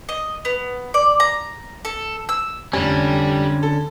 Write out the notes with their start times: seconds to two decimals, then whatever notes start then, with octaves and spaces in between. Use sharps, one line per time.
0.09 D#5
0.45 B3
0.94 D5
1.20 A#5
1.85 A4
2.29 E6
2.73 F1 D3 G3 C#4
3.63 A4